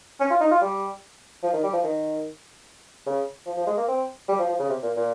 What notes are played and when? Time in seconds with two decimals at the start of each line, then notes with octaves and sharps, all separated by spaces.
0.20 C#4
0.31 F4
0.41 D#4
0.51 F4
0.61 G3
1.43 F3
1.53 D#3
1.63 G3
1.74 F3
1.84 D#3
3.06 C#3
3.46 F3
3.57 F3
3.67 G#3
3.77 A#3
3.88 C4
4.29 G3
4.39 F3
4.49 F3
4.59 C#3
4.69 C3
4.83 A#2
4.96 A#2